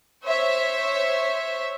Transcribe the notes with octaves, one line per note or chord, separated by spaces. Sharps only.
C5 C#5 E5